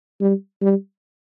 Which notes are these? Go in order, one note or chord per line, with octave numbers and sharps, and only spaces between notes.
G3
G3